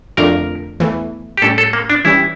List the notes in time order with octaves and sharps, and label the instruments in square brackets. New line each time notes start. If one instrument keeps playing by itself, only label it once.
[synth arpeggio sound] F2 D3 A3 D4 F4 [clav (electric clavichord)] A#4
[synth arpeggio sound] E2 E3 A3
[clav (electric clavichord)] G4
[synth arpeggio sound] A2 G3 C#4 [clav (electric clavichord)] A4
[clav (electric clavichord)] A4
A#3
D4
[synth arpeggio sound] E3 G3 C#4 G4 [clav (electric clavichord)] E4